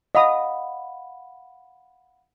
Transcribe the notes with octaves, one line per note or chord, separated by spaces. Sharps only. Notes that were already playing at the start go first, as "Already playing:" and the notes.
D#5 F5 F#5 B5 D#6